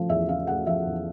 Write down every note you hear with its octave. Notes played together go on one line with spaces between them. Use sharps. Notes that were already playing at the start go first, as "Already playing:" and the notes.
Already playing: C#3 F3 A3
E2 E5
C#3 F5
A3 F#5
F3 E5
E2